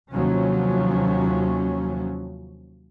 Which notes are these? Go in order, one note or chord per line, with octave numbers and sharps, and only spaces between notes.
D#2 C3 F3 F#3 C#4